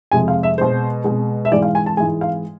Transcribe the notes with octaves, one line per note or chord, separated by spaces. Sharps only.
F2 C3 G#3 G#5
F5
E5
B2 G#3 C5
B2 G#3
E5
G#2 E3 G#3 D5
F5
G#5
A5
G#2 E3 G#3 G#5
F5